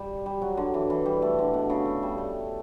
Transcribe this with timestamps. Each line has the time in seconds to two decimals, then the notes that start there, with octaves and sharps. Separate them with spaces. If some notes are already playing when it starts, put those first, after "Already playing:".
Already playing: G3
0.26 G3
0.42 F#3
0.57 D3
0.74 E3
0.90 E3
1.06 G3
1.22 A3
1.39 D3
1.54 B2
1.70 C#3
1.86 A3
2.03 G3
2.18 A3